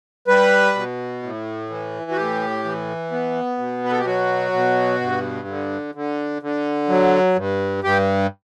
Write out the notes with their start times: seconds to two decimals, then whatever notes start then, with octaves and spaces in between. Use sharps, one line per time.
0.28 G3 B4
0.76 B2
1.23 A2
1.70 E3
2.11 F#4
2.17 A2 G4
2.64 E3
3.11 B3
3.58 B2
3.84 B4
3.91 A4
3.98 G4
4.05 F#3 F#4
4.53 B2
5.01 G2
5.47 D3
5.95 D3
6.42 D3
6.89 F#3
7.36 G2
7.84 G2 G4